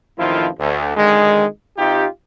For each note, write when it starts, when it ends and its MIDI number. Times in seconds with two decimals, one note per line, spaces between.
0.18 0.48 33
0.18 0.48 41
0.18 0.48 51
0.18 0.48 53
0.18 0.48 64
0.18 0.48 65
0.60 0.93 38
0.97 1.46 32
0.97 1.46 50
0.97 1.46 51
0.97 1.46 56
1.77 2.06 48
1.77 2.06 63
1.77 2.06 65
1.77 2.06 67